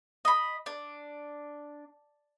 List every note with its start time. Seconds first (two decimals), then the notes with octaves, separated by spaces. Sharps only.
0.25 D#5 B5
0.66 D4